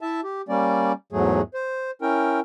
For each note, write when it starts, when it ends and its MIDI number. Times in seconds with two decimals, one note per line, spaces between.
0.01 0.21 64
0.01 0.21 76
0.01 0.21 81
0.24 0.42 67
0.49 0.93 55
0.49 0.93 58
0.49 0.93 61
0.49 0.93 74
1.12 1.41 40
1.12 1.41 44
1.12 1.41 54
1.12 1.41 57
1.12 1.41 68
1.54 1.91 72
2.02 2.40 61
2.02 2.40 64
2.02 2.40 70
2.02 2.40 79